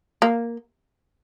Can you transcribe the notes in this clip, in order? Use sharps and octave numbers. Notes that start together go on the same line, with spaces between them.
A#3